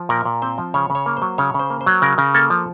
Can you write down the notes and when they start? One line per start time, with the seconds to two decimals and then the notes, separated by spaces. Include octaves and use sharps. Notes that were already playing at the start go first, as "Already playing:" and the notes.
Already playing: F3
0.09 A#2 A#4
0.25 A#2
0.42 C4 C5
0.58 F3
0.74 C#3 C#5
0.90 C#3
0.95 C#5
1.06 A#3
1.17 F#3 C5
1.38 C#3 C#5
1.54 C#3
1.59 C5
1.70 A#3
1.81 C5
1.86 F#3
2.02 C#3 A#4
2.18 C#3
2.34 A#3 A4
2.50 F3